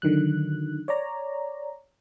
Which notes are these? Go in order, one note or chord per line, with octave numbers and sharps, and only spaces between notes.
D3 D#3 F#3 F#6
C#5 D5 A#5